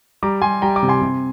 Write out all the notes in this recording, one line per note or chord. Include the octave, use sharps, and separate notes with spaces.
G3 A#5 D6
G3 G#5 C6
G3 G5 A#5
A#5 D6
C3
G#5 C6
C3